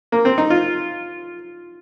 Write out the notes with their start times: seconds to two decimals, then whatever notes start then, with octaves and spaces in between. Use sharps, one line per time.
0.12 A#3
0.25 C4
0.38 D#4
0.50 F4